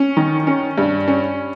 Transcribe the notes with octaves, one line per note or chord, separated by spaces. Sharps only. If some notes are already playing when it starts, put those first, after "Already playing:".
Already playing: C#4
D#3
C#4
G2
C#4